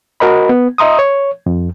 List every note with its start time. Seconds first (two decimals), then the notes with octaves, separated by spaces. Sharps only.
0.20 F#4 A#4 D#5 B5
0.49 B3
0.78 D#5 E5 A#5 C6 D#6
0.99 C#5
1.46 F2